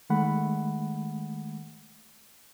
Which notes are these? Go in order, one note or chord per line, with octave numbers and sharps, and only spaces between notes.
D#3 G#3 A3 F#5 B5